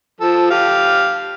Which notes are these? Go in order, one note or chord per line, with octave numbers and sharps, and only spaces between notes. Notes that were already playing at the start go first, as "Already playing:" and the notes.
F3 A4
G4 F5